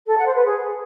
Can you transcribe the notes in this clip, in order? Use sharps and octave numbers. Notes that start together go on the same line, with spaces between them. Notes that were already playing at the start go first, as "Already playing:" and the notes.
A4
F#5
C5
B4
G#4